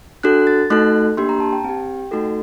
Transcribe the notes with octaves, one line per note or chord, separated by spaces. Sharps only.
D4 F#4 A4 F#6
A6
A3 D#4 F#4 A4 F#6
A#3 D4 G4 C6
A#5
A5
G5
C4 G4
A3 D#4 F#4 A4